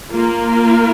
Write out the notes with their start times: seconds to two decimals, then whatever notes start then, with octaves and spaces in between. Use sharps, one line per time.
0.12 A#3 F4 A#4